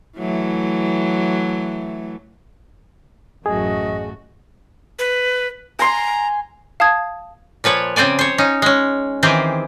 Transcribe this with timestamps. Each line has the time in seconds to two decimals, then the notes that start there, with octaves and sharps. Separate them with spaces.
0.18 E3 F#3 A3
3.46 A1 F#2 A3 F#4 G#4 D#5
4.99 B4
5.79 G#5 A#5 C6
6.80 F5 A5 D#6 G#6
7.64 A#2 F3 B4 C#5
7.96 C#3 C4 C5 D5 G#5
8.19 C5 C#5
8.38 C#4 D#4
8.62 G#3 C#4
9.23 D#3 E3 C4 G4 G#4 C5